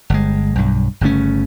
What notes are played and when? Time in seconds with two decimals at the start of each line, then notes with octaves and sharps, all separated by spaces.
0.10 G1 G#3
0.55 B1 G2
1.01 G1 C#3 A3 C#4